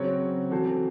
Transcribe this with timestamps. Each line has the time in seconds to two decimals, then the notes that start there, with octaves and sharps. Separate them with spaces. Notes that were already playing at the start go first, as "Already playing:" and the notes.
Already playing: C#3 F#3 C4 F#4 C#5
0.51 E3 C4 F#4 A4 C5